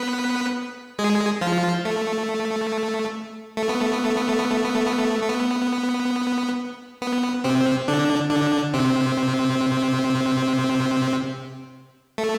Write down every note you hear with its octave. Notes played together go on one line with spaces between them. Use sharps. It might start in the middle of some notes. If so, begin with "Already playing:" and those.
Already playing: B3 B4
G#3 G#4
F3 F4
A3
A3
B3
A3
B3
A3
B3
A3
B3
A3
B3
A3
B3
A3
A3
B3
B3
C3 C4
D3 D4
D3 D4
C3 C4
A3